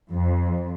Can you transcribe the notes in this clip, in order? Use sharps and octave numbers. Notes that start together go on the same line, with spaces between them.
F2